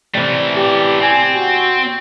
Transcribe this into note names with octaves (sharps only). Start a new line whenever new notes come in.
C3 E3 G3 A3
G4
C4 G#5
F#4